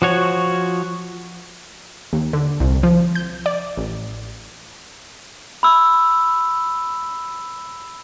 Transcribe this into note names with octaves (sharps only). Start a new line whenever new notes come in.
F3 F#4 C#5
D#2
D3
C2
F3
G6
D5
A1
B5 E6